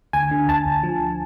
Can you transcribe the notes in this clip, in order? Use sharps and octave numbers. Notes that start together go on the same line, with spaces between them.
D2 G#5
D3
D2 A5
D2
F3